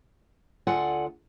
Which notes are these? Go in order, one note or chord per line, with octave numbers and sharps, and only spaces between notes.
D2 F4 A4 D5 F#5 G#5